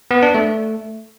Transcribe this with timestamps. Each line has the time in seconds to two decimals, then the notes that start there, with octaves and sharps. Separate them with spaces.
0.11 B3
0.23 D4
0.35 A3